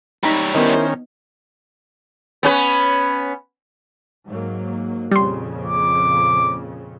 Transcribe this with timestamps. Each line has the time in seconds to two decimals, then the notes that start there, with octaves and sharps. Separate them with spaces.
0.23 G3 D#4 C#5 A#5 B5
0.55 D#3 B3 C#4 E4 A#4 C5 D#5
2.43 B3 C#4 B4
4.27 G#2 F#3 A#3
5.12 F2 A#2 C#3 G3 C6
5.66 D6